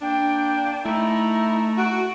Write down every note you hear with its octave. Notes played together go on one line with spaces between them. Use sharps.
A#3 D4 G5
A3 D#4 E4 A#5
F#4 D7